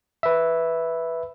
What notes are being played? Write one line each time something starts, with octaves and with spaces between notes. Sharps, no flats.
B4 E5